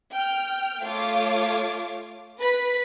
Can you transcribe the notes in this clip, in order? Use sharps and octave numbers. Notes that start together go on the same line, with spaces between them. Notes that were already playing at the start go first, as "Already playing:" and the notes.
G5 F6
A3 F4 C#5 F5 D6
B4 B6